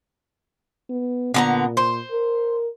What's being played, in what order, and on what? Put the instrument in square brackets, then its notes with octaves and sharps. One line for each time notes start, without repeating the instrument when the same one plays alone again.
[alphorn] B3
[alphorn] A#2 [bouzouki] D3 B3 A#5
[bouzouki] C5
[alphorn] A#4